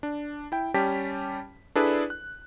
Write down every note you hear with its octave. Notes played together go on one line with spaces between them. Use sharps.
D4
E4 G5
G3 C#4 G4 G5 A5 B6
D4 E4 G#4 A4 B4 D5
F#6